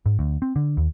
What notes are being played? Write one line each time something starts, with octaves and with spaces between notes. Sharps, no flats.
G#2
D2
C4
D3
D#2